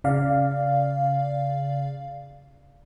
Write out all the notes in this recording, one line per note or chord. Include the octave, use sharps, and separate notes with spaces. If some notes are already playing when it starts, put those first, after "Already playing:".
C#3 D5 F5